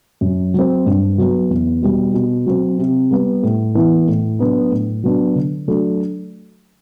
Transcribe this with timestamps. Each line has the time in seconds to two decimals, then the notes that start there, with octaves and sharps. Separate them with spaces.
0.21 F#2
0.54 F#3 C4
0.86 G2
1.18 F#3 B3
1.50 E2
1.82 B2 G3
2.14 B2
2.46 F#3 C4
2.79 C3
3.11 G3 B3
3.43 A2
3.75 E3 B3 E4
4.08 A2
4.39 F#3 B3 D4
4.71 A2
5.04 F#3 B3 D4
5.35 D3
5.68 F#3 A3 D4